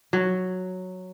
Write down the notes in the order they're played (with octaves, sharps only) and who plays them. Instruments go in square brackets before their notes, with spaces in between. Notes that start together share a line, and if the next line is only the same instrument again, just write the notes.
[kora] F#3